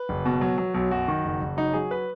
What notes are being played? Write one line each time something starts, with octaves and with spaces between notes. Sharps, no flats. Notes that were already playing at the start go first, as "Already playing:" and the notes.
Already playing: B4
F#1
B2
F#3
F#3
B1
F#2 F#4
D#3
F#1
F#1
F#3 D#4
F#3 G#4
B4